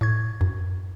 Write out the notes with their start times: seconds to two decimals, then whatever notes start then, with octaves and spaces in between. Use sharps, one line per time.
0.01 A2 C#6 G#6
0.41 F#2